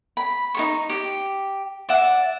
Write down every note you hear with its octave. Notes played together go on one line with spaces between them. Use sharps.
B5
D#4 A4 C#6
G4
D5 E5 F#5